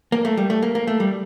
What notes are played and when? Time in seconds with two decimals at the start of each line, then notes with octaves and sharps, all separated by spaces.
0.12 A#3
0.25 A3
0.37 G3
0.50 A3
0.62 A#3
0.75 A#3
0.87 A3
1.00 G3